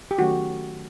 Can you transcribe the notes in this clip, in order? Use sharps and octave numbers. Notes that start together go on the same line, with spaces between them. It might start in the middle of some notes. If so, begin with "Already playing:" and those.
G4
D#3 F#3 A3 C#4 F#4